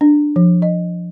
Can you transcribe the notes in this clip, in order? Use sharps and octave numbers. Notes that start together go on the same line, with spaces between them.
D4
F3
D#5